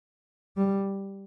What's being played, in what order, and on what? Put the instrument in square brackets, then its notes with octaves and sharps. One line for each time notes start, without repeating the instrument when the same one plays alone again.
[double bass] G3